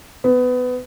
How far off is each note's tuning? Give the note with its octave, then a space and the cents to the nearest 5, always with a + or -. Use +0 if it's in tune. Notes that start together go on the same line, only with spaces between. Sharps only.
B3 +20